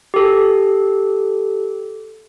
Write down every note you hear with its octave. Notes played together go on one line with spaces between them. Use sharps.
G4 A4